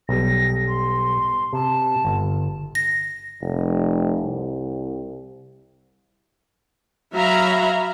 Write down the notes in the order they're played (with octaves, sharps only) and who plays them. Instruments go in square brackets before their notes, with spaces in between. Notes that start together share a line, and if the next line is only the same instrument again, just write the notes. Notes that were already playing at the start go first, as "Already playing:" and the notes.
[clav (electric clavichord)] B1 G3 [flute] A#6
[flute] C6
[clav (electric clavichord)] C3 [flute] A5
[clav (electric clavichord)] G1
[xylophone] A#6
[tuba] F1
C2
[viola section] F#3 E5 F5 A#5 B5